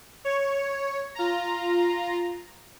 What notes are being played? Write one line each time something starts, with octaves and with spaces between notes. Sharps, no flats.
C#5
F4 A#5